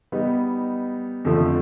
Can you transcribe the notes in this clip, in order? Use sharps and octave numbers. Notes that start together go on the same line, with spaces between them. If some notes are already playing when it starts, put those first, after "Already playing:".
G3 B3 D#4
F2 D3 F3 A3